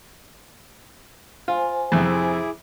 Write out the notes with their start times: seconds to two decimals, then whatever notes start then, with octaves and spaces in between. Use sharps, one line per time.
1.48 F4 C5 G#5
1.92 F2 C3 E4 G#4 D6